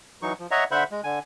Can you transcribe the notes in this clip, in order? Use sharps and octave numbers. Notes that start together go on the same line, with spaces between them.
E3 F#3 D#4 C#6
F3
C#5 D#5 E5 F#5 A#5
D3 C5 E5 F#5 B5
G#3
D3 G#5